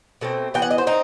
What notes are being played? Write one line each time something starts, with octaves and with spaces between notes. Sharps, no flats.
B2 A3 C4
E3 B3 G5
F#5
D#5
C5
C4 D#4